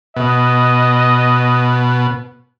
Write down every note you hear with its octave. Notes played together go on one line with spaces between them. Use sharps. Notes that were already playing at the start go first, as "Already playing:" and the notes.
B2 D#5